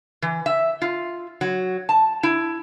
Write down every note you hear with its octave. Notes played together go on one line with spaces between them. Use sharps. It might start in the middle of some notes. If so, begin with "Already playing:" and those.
E3
E5
F4
F#3
A5
E4